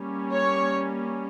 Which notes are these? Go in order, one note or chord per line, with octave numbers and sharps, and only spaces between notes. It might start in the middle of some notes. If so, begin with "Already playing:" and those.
Already playing: G3 A#3 C#4
C#5